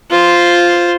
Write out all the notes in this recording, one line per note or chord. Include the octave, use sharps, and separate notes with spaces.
F4 C5